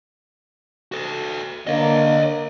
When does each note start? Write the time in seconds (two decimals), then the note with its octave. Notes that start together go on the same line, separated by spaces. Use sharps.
0.92 F#4 A4
1.67 D3 A#3 C#5 D#5